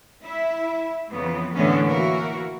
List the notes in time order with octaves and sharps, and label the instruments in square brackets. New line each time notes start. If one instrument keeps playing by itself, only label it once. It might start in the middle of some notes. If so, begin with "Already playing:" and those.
[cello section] E4 E5
F2 C#3 E3 B3
E2 A2 D3 E3 B3 C#4
E3 A#3 E4 F#4 A#4